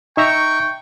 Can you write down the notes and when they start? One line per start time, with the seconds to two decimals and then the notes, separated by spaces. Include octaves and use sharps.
0.17 D#4 E5 G5 A#5 C#6